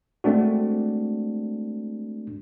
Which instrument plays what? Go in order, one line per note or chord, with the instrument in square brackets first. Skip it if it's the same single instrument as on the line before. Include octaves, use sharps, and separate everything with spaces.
[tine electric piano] G#3 A3 C4 D4 F#4